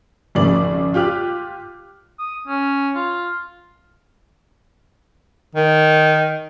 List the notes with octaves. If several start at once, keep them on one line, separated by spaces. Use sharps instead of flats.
G#1 F2 C#3 D5 F#7
F4 G4 D6 F6 F#6
D#6
C#4
F4
D#3